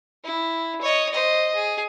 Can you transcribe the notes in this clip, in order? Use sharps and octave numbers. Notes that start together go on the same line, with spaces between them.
E4
C#5 D#5
C5 D#5
G#4